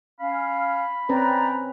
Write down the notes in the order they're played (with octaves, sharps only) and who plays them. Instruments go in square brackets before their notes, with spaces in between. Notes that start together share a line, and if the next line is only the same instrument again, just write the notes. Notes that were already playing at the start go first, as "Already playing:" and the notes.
[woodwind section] C#4 F5 [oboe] B5
[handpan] C4 C#4 B4 [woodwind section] D5 G5 A#5